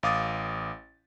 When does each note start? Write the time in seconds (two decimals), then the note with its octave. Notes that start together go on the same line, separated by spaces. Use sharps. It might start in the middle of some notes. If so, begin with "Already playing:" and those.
0.03 A1 F5 D6 D#6 A6